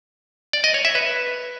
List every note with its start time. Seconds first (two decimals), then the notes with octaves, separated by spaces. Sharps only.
0.53 D5
0.64 D#5
0.74 C#5
0.85 E5
0.95 B4